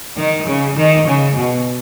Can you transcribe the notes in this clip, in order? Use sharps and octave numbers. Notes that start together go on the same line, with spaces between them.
D#3
C#3
D#3
C#3
B2